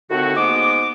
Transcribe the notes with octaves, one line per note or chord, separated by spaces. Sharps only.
D#2 A2 D3 C4 F#4
G#2 G#3 A#3 B3 D6